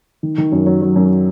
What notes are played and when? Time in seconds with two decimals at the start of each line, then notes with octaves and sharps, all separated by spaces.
0.23 D#3
0.38 D#3
0.52 F#2
0.66 F#3
0.82 F#3
0.96 F#2